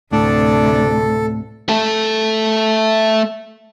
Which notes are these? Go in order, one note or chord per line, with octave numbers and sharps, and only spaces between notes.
D2 A2 C3 D4 A4
A3 A4